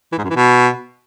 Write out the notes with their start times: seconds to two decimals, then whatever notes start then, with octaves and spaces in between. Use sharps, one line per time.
0.12 E3
0.18 G#2
0.24 F#2
0.30 E3
0.36 B2